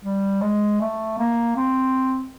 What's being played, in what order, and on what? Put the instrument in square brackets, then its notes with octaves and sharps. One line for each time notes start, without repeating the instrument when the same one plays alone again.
[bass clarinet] G3
G#3
A3
A#3
C4